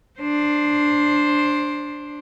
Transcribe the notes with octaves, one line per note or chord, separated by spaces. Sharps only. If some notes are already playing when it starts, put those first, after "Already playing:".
D4 C5